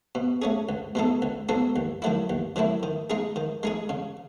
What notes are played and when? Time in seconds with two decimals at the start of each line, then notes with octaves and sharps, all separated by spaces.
0.15 B2
0.42 A3 C#4 G#4
0.69 C#2
0.95 B2 G#3 D#4 A4
1.22 C#2
1.49 B2 G#3 D#4 A4
1.76 D#2
2.02 D#3 F#3 A3 E4
2.30 D#2
2.56 D#3 F#3 A3 E4
2.83 D#3
3.10 G#3 D#4 G#4
3.36 D#3
3.63 G#3 D#4 G#4
3.89 C#3